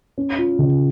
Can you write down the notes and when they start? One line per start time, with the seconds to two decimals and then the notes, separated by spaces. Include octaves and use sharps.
0.18 C#4
0.38 F4
0.59 C#3